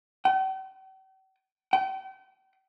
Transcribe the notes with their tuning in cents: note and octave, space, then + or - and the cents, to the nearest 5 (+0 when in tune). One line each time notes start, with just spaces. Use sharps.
G5 -45
G5 -40